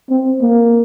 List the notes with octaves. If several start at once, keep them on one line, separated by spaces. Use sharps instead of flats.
C4
A#3